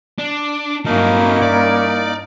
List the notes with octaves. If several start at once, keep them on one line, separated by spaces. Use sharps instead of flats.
D4
G2 F#3 A#3 C#4 D#4 E4 A4 A#4
D5